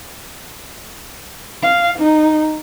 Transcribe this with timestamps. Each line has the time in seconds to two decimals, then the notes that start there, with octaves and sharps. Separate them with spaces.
1.63 F5
1.99 D#4